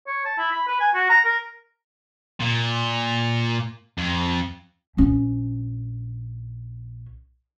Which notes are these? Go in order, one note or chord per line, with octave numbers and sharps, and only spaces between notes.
C#5
A5
E4
B5
B4
G#5
F#4
A#5
A#4
A#2
F2
A#1 C#4